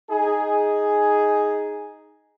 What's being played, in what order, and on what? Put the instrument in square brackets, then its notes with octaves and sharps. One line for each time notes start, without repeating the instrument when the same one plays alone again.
[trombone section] D#4 G#4